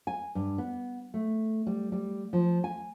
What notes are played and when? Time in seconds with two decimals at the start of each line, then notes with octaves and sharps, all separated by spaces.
0.07 G#5
0.35 G2
0.58 B3
1.14 A3
1.67 G3
1.92 G3
2.33 F3
2.64 G#5